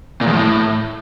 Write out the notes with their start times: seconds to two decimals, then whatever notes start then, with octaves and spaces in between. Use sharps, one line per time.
0.21 A#2
0.27 E2
0.33 A2